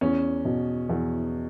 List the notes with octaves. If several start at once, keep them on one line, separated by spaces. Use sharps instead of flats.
E2 C#4
B2
E2